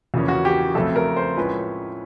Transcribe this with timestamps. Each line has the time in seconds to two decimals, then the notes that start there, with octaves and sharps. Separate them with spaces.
0.14 E2 C#3 F3 A#3 C#4
0.28 F#4
0.45 G4
0.75 F2 C#3 F#3 A3 C4 A4
0.96 A#4
1.16 C5
1.37 A2 F3 G#3 C#4 B4